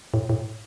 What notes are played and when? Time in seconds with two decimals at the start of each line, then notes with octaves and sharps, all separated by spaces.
0.14 A2
0.30 A2